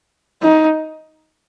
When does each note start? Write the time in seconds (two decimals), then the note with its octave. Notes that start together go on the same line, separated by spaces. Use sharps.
0.42 D#4